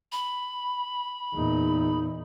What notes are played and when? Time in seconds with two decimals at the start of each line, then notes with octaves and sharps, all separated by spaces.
0.12 B5
1.34 E2 A#2 D#4